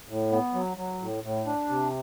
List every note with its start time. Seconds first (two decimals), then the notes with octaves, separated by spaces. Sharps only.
0.09 A2
0.32 B3
0.54 F#3
0.77 F#3
1.01 A2
1.23 A2
1.46 D4
1.69 C3